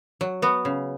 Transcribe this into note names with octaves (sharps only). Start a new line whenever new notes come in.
F#3
B3 F#4
C#3